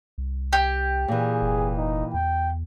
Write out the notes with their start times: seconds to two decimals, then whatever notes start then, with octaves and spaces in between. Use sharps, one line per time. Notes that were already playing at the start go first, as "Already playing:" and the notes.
0.18 C2
0.53 G4
1.08 A#2 E3 G#4
1.42 F1
1.78 D#4
2.14 E2 G5